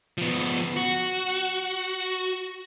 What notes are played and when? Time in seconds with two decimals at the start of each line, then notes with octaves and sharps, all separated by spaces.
0.18 F3 B3
0.76 F#4